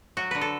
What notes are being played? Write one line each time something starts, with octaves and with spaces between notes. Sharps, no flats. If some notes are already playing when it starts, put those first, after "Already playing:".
F#3 F#4
D3 B4
A4